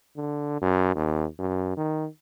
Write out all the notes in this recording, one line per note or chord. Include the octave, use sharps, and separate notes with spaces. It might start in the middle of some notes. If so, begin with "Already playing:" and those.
D3
F#2
D#2
F#2
D#3